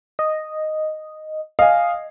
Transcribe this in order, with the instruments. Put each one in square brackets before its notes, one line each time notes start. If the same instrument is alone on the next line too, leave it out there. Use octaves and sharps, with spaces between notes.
[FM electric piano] D#5
[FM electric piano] D#5 [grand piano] F5 G#5